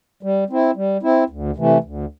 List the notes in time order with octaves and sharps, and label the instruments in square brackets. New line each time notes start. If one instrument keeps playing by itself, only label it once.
[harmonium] G3
C4 E4
G3
C4 E4
D2
C3 E3 A3
D2